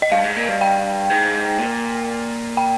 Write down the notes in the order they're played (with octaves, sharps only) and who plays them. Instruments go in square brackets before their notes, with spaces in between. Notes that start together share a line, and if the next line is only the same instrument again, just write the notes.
[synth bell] D#5
[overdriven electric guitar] G2 [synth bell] F5
[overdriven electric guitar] G#2
A#2
G2
[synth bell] G5
[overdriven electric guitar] G#2
A#2
[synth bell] G5